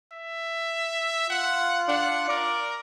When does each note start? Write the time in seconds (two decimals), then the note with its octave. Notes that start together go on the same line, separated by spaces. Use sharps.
0.12 E5
1.30 F4 F#5
1.88 D4 F#5
2.29 A#4 D5